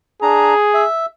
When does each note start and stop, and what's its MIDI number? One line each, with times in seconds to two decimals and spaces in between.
0.22 0.54 62
0.22 0.85 68
0.22 0.54 82
0.74 1.06 76